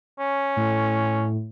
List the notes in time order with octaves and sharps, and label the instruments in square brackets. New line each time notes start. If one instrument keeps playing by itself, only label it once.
[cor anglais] C#4
[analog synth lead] A2